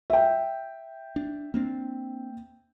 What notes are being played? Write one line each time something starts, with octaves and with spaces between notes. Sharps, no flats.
E5 G5
D4
A#3 C4 D4